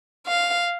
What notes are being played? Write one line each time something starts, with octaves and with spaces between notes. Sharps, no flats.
F5